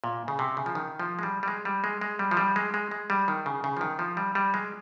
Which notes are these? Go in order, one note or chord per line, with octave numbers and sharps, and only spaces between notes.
A#2
C#3
C3
C#3
F3
D#3
F3
G#3
G3
G3
G#3
G3
G#3
G#3
G3
F3
G3
G#3
G#3
G#3
G3
D#3
C#3
C#3
F3
D#3
F3
G3
G3
G#3